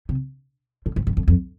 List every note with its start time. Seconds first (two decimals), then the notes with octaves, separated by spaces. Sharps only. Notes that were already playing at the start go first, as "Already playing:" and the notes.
0.09 C3
0.86 A2
0.96 G#2
1.07 G2
1.17 F2
1.28 F2